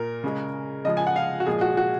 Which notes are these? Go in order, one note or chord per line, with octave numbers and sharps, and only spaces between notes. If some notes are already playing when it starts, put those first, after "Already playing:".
Already playing: A#2 A#4
C#3 G#3
C#3 F3 G#3 D#5
G#5
F#5
F5
F#4
A#2 F3 G#3 G#4
F#4
F#4